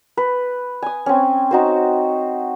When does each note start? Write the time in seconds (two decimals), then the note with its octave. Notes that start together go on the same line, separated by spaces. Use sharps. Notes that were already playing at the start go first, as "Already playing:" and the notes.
0.17 B4
0.82 G#5 D#6
1.06 C4 C#4
1.51 D#4 F#4 C5